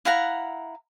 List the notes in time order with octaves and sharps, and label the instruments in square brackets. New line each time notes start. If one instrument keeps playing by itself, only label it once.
[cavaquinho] E4 F5 F#5 A#5